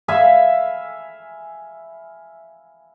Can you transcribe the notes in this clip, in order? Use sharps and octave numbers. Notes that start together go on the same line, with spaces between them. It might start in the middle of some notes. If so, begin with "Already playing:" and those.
E5 F5 G#5 B5